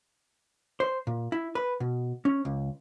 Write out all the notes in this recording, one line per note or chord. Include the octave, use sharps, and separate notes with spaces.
C5
A#2
E4
B4
B2
C#4
C#2